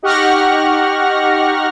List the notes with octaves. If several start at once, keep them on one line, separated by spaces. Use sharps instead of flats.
D#4 G4 F#5 C#6 F6 A#6